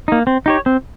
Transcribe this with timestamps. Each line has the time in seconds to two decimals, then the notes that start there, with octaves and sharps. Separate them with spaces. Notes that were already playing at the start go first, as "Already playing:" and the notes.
0.08 A#3 D#4
0.27 C4
0.46 D#4 G4 C#5
0.66 C4